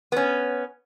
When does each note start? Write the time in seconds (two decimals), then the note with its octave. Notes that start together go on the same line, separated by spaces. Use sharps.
0.12 B3 C#4